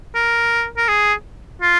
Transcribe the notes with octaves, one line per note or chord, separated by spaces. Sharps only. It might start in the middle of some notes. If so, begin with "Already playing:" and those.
A#4
A#4
G#4
F4